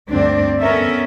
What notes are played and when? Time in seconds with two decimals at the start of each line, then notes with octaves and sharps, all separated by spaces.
0.10 D2 G2 C4 D4
0.61 B3 C#4 A4 A#4 E5